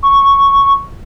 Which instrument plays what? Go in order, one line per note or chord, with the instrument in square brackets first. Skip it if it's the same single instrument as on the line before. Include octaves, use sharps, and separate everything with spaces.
[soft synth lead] C#6